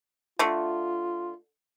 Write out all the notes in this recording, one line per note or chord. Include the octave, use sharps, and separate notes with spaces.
D3 A3 F4